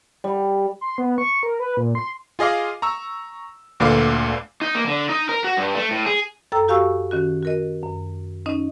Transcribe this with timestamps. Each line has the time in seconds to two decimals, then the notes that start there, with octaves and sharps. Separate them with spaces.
0.24 G3
0.81 C6
0.98 B3
1.18 C#6
1.43 A#4
1.59 B4
1.77 A#2
1.95 C6
2.39 F4 G#4 D#5 F5 D6
2.82 A#5 C#6 E6
3.80 D2 A#2 D3 B4 F5 D6
4.61 D#4
4.75 A#3
4.87 D3
5.09 D#4
5.29 A#4
5.44 F#4
5.57 G2
5.75 A3
5.91 A2
6.06 G#4
6.52 F#2 A4 G5 A#5 E6
6.68 F#4 G4 F5 G#5 C#6 E6
7.11 D#3 C#4 F#4
7.43 F#4 A#4 D#5
7.83 F#2
8.46 C#4 D#4 D#5